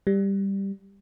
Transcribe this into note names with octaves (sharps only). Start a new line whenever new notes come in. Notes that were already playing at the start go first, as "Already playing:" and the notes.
G3